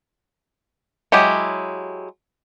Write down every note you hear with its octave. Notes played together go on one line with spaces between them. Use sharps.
F#3 G#3 E4 G4